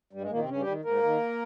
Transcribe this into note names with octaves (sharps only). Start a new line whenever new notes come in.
G2 G3
G#3
A#2 D#3 A#3
C3 C4
G2 C#3 C#4
G3 G4
D#3
G#2 A#3 A#4
D#3